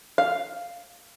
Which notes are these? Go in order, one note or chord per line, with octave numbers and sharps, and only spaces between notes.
F5